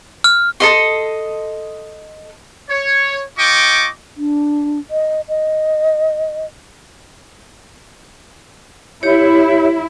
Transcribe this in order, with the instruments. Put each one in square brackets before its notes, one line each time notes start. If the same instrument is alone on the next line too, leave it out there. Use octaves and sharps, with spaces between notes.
[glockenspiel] F6
[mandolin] A4 D#5 C6
[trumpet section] C#5
F4 D#5 G5 C#6 D6
[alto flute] D4
D#5
D#5
[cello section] E4 [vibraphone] G4 C#5